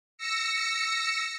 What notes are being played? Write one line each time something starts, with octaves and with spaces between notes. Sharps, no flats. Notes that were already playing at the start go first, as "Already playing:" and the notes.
E6 A#6 C#7